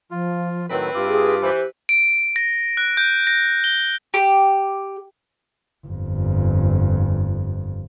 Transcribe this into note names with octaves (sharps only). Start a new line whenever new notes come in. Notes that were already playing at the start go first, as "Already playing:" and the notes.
F3 F4
A2 D#3 F#3 C4 E4 B4
G2 F4 G4 D6
G#4
E3 B4 C5
D7
A#6
F#6
G6
A#6
G7
G4
G1 F2